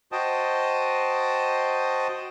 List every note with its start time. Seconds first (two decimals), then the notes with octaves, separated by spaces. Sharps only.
0.12 F#4 C5 D#5 G5 A5 D#6